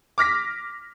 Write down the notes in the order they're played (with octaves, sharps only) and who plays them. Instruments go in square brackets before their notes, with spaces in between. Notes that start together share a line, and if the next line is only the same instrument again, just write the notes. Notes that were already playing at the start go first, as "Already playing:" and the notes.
[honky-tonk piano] D6 F6 A#6 B6